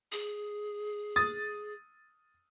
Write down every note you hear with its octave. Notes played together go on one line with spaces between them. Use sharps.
G#4
D#6 A6